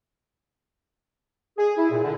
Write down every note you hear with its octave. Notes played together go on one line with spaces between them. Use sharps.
G#4
E4
A#2
D3